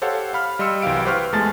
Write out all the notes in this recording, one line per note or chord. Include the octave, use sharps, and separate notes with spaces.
G4 A4 C5 C#5 F5 F#5
F5 B5 F6
G3 D#5 C6 E6 C#7
C2 E3 F#3 G4 F5 D7
G4 B4 C5 C#6 F6
E2 G#3 A3 G#5 A5 A6